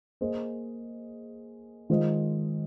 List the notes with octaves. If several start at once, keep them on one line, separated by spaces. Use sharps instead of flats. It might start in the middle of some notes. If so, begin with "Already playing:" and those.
A#3 G#4 C5 D#5
D#3 G#3 F4 C5 D#5